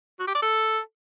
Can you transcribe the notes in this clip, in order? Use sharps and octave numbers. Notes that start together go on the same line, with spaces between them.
F#4
G4
D5
A4